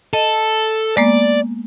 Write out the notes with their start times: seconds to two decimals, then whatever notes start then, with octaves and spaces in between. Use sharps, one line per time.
0.13 A4 D#5
0.97 G#3 A#3 B3 D5